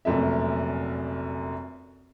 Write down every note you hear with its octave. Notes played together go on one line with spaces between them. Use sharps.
F1 A#1 F#2 A3 E5